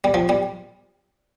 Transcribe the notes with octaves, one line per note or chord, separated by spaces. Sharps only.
G3
F3
G3